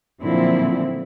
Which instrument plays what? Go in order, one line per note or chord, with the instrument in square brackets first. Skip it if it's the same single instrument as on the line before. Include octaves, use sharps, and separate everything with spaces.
[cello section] A#2 D3 F3 F#3 C4 E4